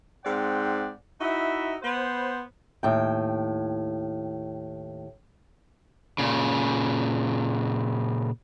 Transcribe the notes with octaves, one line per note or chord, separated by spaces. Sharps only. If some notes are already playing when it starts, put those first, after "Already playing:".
G#2 C4 D5 F#5 G5
D#4 E4 F#4 E5
B3 B4 C5
D#2 A2 G5
A#2 C#3